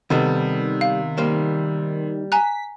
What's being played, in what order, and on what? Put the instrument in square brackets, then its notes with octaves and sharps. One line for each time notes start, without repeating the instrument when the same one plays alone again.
[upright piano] C3 B3 [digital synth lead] D#3 [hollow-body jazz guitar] G3 A4 D#5
[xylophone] F5
[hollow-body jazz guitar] G3 A#3 C5
[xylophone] G#5 A#5 F#6 [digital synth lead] B6